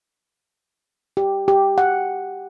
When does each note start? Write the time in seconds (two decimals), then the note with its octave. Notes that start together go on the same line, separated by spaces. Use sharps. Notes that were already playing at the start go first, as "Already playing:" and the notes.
1.17 G4
1.48 G4
1.78 F#5